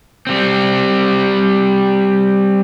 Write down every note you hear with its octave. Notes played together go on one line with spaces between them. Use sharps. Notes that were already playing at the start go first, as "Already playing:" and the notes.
G3 C4